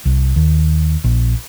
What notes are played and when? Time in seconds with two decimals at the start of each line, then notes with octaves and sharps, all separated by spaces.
0.05 C2
0.36 D#2
1.04 A#1